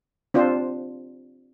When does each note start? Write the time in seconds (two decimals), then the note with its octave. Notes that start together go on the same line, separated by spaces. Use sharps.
0.34 C4 D4 F4 C5